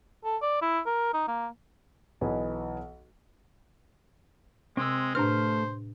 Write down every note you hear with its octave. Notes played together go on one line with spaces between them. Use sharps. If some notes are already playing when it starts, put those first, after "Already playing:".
A4
D5
E4
A#4
D#4
A#3
B1 E3 B4 D#5 G#5
C3 G#3 C4 E6
A2 A3 D4 B4 C5 F6